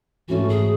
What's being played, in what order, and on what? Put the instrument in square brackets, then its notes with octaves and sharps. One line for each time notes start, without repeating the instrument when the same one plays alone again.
[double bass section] G#2 E3 A3 C#4 [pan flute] F#4
[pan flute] G#4